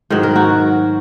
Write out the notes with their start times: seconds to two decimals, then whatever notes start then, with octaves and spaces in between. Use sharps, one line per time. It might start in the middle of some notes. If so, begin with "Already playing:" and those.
0.10 G#2 D#3 F#3
0.23 A#4
0.36 F#4